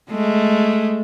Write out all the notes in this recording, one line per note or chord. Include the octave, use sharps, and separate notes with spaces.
G#3 A3